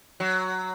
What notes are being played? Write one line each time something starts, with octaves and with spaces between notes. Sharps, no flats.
F#3